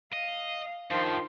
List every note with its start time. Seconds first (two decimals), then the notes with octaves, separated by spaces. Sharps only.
0.13 D#5 F5
0.91 G2 D#3 F3 C6